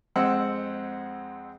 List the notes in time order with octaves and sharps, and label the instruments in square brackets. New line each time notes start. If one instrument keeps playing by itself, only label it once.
[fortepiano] F2 G#3 C4 F#5 E6